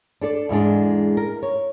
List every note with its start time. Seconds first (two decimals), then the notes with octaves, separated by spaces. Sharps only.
0.21 D4 A4 D5
0.49 E2 G#2 G#3 D4
1.17 A#4
1.43 C#5